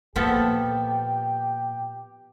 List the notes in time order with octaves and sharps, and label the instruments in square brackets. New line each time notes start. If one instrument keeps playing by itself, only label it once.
[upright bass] A#2 [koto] F3 B3 A4 [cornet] G4